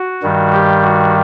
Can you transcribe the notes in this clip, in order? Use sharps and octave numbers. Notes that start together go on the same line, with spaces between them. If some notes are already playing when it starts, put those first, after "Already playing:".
Already playing: F#4
G2 D#3 G3
G4
F#4